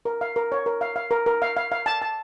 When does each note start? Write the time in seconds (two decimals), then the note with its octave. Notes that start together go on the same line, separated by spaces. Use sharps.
0.05 A#4
0.21 F5
0.36 A#4
0.52 C#5
0.66 A#4
0.81 F5
0.96 F5
1.11 A#4
1.26 A#4
1.42 F5
1.57 F5
1.72 F5
1.86 A5
2.02 A5